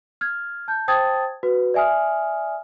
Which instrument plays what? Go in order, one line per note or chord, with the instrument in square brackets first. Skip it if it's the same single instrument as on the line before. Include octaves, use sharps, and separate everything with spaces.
[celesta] F6 G#6
A5 G6
C5 G5 A5 D#6 G#6 A6
F#4 B4
D5 E5 G#5 D#6 F6